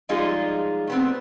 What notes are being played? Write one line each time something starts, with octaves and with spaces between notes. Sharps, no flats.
F3 G3 G#3 D#4 F4 G#4
A3 B3 C4